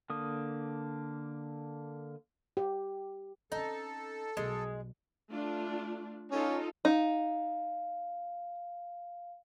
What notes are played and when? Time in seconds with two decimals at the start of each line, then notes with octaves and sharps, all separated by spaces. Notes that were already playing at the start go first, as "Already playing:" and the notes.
0.10 D3 A#3 D#6
2.57 G4
3.52 C4 C#4 D#4 A4
4.37 B1 G3 G#3
5.30 A3 D4 F4
6.31 C#4 D#4 F4 A4
6.85 D#4 F5